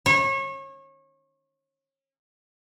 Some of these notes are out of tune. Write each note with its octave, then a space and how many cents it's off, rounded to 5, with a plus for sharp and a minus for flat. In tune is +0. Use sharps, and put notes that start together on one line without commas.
C#5 -30